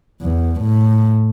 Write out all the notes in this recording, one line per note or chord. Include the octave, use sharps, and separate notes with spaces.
E2
A2